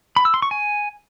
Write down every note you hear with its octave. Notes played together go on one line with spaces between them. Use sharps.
B5
E6
C6
C#6
G#5